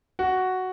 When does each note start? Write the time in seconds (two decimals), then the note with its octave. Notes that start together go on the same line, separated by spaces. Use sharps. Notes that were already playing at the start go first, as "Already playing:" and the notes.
0.19 F#4